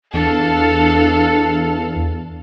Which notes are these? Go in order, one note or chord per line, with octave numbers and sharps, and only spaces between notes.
E2 D4 A4 F5